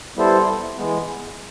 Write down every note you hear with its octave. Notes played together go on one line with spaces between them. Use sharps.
G3 B3 E4 A4 C5
E3 G#3 B3